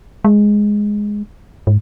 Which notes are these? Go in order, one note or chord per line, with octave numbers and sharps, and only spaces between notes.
G#3
G#2